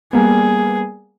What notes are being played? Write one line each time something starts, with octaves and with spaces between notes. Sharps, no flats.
G3 A#3 B3 G#4